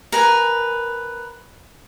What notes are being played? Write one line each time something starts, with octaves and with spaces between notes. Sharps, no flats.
A#4 B4 G#5